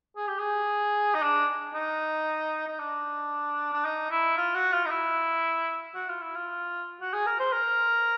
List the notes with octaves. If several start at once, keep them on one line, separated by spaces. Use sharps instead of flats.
G#4
G4
G#4
D#4
D4
D#4
D#4
D4
D4
D#4
E4
F4
F#4
F4
D#4
E4
F#4
F4
E4
F4
F#4
G#4
A#4
C5
A#4